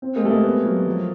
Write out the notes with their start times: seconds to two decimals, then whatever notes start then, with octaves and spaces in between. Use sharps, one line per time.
0.02 C4
0.16 G#3 A#3
0.24 G3 A3
0.30 G#3 A#3
0.44 B3
0.66 F#3
0.87 F3